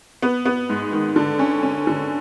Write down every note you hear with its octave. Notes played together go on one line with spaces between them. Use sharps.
B3
B3
G#2
D#3
D3
C#4
C#4
D3